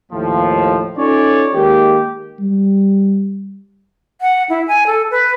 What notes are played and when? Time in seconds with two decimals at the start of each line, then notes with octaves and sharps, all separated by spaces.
0.12 D#2 A2 F3
0.98 C#4 D#4 F4 A4 C#5 D5
1.55 D#3 G#3 A#3 G4
2.40 G3
4.21 F#5
4.49 E4
4.68 G#5
4.87 A4
5.11 B4